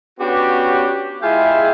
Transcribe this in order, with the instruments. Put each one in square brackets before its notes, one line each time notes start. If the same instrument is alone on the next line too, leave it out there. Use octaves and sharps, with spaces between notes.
[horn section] B3 C#4 D4 F#4 G4
G#3 E4 F4 G4 G#4 E5